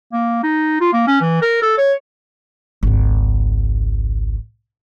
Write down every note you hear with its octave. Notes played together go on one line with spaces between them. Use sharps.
A#3
D#4
F4
A#3
C#4
E3
A#4
A4
C#5
G#1 C#2